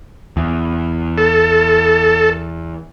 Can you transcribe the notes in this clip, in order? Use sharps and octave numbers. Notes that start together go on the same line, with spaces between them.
E2
A4